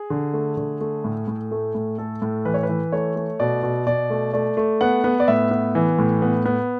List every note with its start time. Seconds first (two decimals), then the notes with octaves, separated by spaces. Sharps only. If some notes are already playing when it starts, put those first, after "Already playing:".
Already playing: G#4
0.10 D3
0.34 A3
0.57 D3
0.81 A3
1.04 A2
1.28 A2
1.51 A3
1.75 A2
1.98 A3 A4
2.22 A2
2.45 E3 B4
2.54 C#5
2.63 B4
2.69 E3
2.92 A3 C#5
3.16 A3
3.40 B2 D5
3.63 B2
3.87 B2 D5
4.10 A3
4.33 A3 D5
4.57 A3
4.81 B3 F#5
5.04 B3
5.20 D5
5.28 A2 E5
5.51 B3
5.75 E3
5.99 A2
6.22 B3
6.45 B3